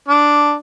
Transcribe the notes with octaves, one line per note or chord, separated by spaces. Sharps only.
D4